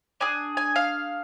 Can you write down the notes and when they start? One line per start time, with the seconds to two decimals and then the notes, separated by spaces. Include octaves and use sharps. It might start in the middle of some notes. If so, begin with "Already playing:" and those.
0.21 D4 G#4 G#5
0.57 G#5
0.76 F5